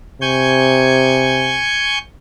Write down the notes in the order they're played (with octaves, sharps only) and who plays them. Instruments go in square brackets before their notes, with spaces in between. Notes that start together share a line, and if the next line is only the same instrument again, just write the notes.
[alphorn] C3 [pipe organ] G#5 C#6 G6